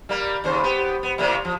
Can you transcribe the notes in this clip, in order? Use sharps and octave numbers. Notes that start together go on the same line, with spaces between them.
G3 A#3
D#2 C#3 C5
B3 G4
B3
A2 C3 A#3
F3